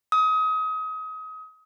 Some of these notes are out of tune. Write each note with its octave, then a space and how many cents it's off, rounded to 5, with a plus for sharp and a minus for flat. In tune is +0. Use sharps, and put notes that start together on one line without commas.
D#6 +30